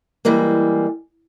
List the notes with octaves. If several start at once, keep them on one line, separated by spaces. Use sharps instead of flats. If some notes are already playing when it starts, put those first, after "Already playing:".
E3 G3 G#3 A#3